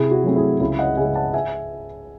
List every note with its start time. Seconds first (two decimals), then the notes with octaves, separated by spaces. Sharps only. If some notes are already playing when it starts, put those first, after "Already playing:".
Already playing: C3 E4 G#4
0.11 F#4
0.24 F#3 A3 C4
0.36 E4 G#4
0.60 C#2 E4 G#4
0.79 D#5 F#5
0.97 C#3 G#3 E5 G#5
1.15 F#5 A5
1.34 E5 G#5